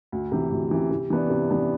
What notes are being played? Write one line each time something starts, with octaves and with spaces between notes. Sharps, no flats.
D2
C3 E3
D2
C3 E3
C3
E3 B3 D4
C3
E3 B3 D4